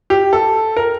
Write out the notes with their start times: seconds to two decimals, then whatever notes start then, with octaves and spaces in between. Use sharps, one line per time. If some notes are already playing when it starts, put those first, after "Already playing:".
0.10 G4
0.33 A4
0.77 A#4